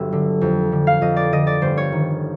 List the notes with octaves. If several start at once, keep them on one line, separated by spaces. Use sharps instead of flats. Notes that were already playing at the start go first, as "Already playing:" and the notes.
Already playing: G1 F#3 E5
D3
F2
D3
F5
F2 D#5
D5
D3 D#5
D5
G1 C5
C#5
D#3